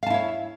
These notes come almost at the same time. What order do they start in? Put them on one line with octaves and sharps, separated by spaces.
F5 A5 E4 C#5